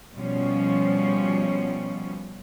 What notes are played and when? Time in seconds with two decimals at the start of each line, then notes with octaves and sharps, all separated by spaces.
0.15 B2 F3 G3 C#4